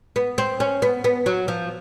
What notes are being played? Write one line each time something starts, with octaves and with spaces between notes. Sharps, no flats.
B3
C4
C#4
B3
B3
F#3
F3